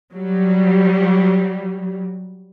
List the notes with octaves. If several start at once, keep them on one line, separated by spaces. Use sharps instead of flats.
F#3 G3